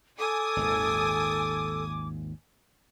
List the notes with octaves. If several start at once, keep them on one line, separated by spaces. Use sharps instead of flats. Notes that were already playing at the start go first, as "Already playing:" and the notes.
A4 G#5 D6 D#6
G#1 D#2 A#2